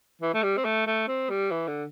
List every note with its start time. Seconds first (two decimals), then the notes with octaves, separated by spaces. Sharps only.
0.21 E3
0.34 A3
0.43 G3
0.57 C4
0.65 A3
0.87 A3
1.08 C4
1.30 G3
1.51 E3
1.68 D3